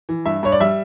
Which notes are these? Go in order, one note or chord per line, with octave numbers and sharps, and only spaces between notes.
E3
G2 E5
G2 C#5
D5
G3 E5